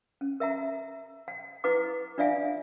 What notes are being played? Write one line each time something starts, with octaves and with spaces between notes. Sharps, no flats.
C#4
A#4 E5 F#5 A#5
F#5
E4 B4 F#5 D6
D4 F4 D5 E5 F5 G#5